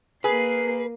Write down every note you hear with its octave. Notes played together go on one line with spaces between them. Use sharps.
A#3 G#4 B4 C7